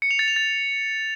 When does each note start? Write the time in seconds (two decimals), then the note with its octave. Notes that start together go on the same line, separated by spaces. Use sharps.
0.02 C#7
0.11 F7
0.19 A6
0.28 F7
0.36 A6